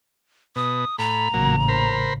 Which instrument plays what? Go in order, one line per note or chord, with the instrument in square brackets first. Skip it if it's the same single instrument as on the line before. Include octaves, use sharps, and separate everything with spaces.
[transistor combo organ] B2 [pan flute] D#6
[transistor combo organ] A2 B5 [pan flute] A#5
[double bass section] A1 A#2 C#3 [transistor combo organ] F#3 A#3
[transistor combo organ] A#4 C5 B5